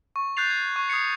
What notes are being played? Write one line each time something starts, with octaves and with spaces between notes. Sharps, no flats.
C#6
F#6 G6 A6 C7 F7
G#6
C#6
D#6 G#6 C7 C#7